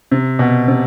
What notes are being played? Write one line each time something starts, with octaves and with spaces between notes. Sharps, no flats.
C3
B2
C3